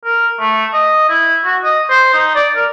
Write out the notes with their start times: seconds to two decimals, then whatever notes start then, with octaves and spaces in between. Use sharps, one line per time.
0.05 A#4
0.40 A3
0.74 D#5
1.09 E4
1.45 F#4
1.64 D#5
1.90 C5
2.14 D#4
2.36 D5
2.56 A#4